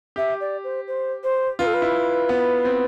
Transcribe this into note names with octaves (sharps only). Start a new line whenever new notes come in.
G4 E5
D5
C5
C5
C5
F4 B4
A4
B4
E4
B3
C4